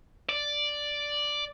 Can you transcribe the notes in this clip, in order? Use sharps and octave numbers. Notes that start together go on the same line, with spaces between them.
D5